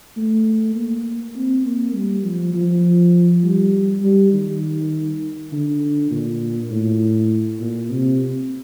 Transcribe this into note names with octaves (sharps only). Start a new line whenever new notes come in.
A3
A#3
C4
A#3
G3
F3
F3
G3
G3
D#3
D3
A#2
A2
A#2
C3